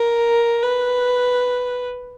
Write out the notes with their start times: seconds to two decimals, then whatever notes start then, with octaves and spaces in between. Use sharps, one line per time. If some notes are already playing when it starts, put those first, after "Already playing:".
Already playing: A#4
0.63 B4